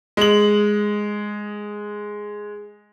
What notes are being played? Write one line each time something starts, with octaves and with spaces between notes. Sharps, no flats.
G#3 F#7